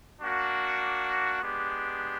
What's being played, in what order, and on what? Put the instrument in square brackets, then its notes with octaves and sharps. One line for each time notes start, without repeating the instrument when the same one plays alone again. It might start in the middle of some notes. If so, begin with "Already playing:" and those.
[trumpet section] A#3 D4 F#4
G#3 B3 D4 G4